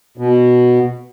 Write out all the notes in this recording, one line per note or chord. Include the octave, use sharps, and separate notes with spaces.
B2